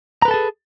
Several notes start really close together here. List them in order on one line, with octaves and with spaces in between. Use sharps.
A#5 B4 A4 A5 G#4